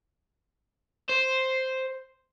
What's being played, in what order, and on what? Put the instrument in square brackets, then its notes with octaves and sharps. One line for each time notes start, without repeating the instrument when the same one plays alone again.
[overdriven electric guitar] C5